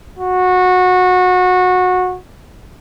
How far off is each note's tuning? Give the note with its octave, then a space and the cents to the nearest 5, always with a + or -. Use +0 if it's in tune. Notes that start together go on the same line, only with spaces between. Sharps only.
F#4 -20